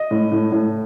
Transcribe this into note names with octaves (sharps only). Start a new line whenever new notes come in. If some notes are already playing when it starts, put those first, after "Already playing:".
Already playing: D#5
A2
A2
A2